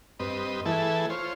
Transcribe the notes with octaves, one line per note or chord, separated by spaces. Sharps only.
G2 C4 B4 D#5
E3 A3 E4 G#4 A4 B4
F4 C5 C#5